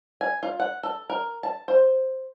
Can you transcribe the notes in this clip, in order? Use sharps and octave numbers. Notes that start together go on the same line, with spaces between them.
G#5
F4
F#5
A4
A#4
A5
C5